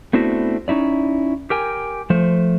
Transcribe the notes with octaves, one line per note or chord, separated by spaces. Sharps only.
A3 B3 C4 D4 E4 F#4
C#4 D#4 E4 D5
G4 A#4 G5 G#5
F3 A3 C5